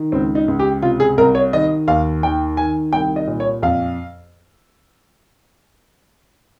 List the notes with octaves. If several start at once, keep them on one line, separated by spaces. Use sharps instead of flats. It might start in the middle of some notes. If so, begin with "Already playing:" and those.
Already playing: D#3
C#2 C4
D#4
C#2
G4
C3 F4
G#4
C2 A#4
C#5
D#3 D#5
D#2 F5
D#3 G5
D#3 G#5
C2 G5
D#5
A#2
C#5
F2 F5